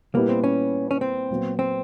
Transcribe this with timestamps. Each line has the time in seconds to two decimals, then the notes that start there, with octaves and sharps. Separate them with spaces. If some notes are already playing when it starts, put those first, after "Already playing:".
0.15 A#2 G3 A#3 B3 E4
0.29 C4
0.44 C#4
0.91 C#4
1.01 C4
1.30 A#2 F#3 B3
1.59 C4